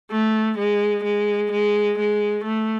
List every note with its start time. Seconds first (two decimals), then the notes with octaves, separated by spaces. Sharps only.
0.11 A3
0.58 G#3
1.04 G#3
1.52 G#3
1.98 G#3
2.45 A3